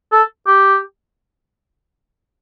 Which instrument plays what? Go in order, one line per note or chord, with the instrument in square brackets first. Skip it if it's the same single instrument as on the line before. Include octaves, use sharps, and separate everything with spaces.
[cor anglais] A4
G4